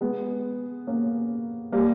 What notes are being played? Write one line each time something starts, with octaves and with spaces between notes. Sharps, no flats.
G#3 B3
A#3 C#4
G3 A#3